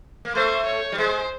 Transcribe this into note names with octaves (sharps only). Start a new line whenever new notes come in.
A#3
A3 C5
C#5
G3
G#3 C5